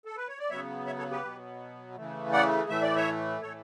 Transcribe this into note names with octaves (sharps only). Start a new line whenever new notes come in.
A4
B4
C#5
D5
C#3 F#3 B3 C#5 E5
C#5 E5
A4 C#5
G4 B4
B2 F#3 B3
C#3 E3 A3
D5 F#5
A2 E3 A3 E5
D5
C#5 E5
A2 E3 A3 A4 C#5